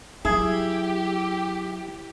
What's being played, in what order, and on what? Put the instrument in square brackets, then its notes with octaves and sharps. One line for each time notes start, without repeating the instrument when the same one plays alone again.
[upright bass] F#3 D4 [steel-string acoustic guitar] E4 [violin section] G4 [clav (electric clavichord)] G#4